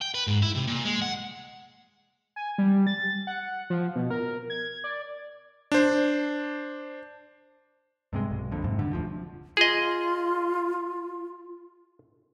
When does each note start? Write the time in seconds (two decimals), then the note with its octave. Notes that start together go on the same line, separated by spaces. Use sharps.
0.02 G5
0.14 B4
0.27 G#2
0.42 E4
0.55 C3
0.67 A#2
0.85 G#3
1.02 F#5
2.36 G#5
2.58 G3
2.87 A6
3.27 F#5
3.70 F3
3.95 B2
4.10 A#4
4.50 G#6
4.84 D5
5.72 D4 C5
8.13 G2 C3 G#3
8.31 B1
8.52 F2 A#2 D3
8.64 F2 G#2 C3
8.79 G2 D3
8.93 E1 D2 F3
9.57 F4 G#4 D#5